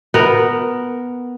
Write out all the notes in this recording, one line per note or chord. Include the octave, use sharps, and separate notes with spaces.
B3 A#4